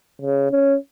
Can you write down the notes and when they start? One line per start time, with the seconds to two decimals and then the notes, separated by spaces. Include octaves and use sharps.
0.22 C#3
0.51 C#4